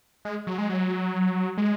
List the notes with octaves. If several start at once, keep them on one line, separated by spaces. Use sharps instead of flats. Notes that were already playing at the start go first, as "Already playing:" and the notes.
G#3
F#3
G#3
F#3
G#3